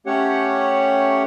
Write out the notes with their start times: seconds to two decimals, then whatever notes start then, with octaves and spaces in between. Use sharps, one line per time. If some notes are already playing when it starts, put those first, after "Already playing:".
0.06 A3 C#4 G4 C#5 F#5